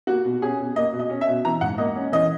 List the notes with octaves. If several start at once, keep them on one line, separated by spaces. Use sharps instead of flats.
A#3 F#4
B2
C#4 G#4
B2
A#3 D#5
B2
D#5
C#4
E5
B2
E3 A#5
G#2 F#5
A#3 D#5
C#4
E3 D#5